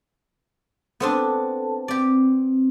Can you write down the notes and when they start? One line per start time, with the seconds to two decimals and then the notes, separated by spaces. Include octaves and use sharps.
1.00 B3 C4 D4 A4 A5
1.88 C4 G4 D5